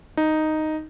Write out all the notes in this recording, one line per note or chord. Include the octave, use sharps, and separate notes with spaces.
D#4